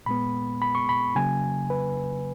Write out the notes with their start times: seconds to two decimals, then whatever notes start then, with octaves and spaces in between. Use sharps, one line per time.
0.06 A#2 G#3 B3 B5
0.62 B5
0.75 C#6
0.89 B5
1.15 C#3 F#3 A#3 G#5
1.70 B4